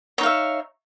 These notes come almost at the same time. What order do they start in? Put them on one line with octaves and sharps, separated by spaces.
C#5 D#4 F5 E5